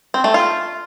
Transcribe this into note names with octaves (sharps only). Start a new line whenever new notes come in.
C4
A3
F4